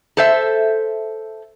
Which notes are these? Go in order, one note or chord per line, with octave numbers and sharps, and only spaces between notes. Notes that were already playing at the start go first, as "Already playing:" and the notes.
A4 C5 E5